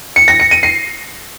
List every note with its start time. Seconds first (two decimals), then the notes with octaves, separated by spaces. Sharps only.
0.16 C#7
0.28 A#6
0.40 C#7
0.51 D#7
0.63 C7